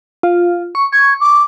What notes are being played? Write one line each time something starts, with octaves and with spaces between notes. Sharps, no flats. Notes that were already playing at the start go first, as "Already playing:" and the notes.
F4
C#6
C#6 G#6
D6